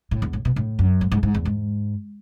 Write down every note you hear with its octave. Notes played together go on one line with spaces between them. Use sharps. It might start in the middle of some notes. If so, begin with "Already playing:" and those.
A2
E2
A2
B2
A2
F#2
G#2
G#2
G#2
E2
G#2